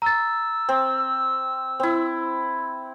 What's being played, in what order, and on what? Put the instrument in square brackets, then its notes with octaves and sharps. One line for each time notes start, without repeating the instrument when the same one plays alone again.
[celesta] A#5 A6 [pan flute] E6
[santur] C4
C4 E4